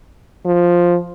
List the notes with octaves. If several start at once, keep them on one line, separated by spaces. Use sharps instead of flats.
F3